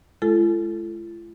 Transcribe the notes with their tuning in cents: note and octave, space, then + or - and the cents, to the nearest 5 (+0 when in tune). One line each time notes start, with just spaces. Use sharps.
G#3 +40 F4 -45 A4 +0